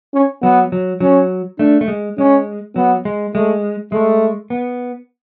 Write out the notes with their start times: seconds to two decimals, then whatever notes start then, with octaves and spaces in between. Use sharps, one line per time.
0.14 C#4
0.42 F#3 B3
0.72 F#3
1.00 F#3 C#4
1.59 A3 D4
1.81 A3
1.88 G#3
2.18 G#3 C#4
2.76 F#3 B3
3.05 G#3
3.34 G#3 A3
3.92 G#3 A3
4.50 B3